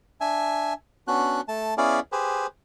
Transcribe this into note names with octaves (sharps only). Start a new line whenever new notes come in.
D4 E5 G#5
B3 C#4 D4 F#4 F#6
A3 A5
B3 C#4 E4 G#4 D5 F5
G4 G#4 B4 C5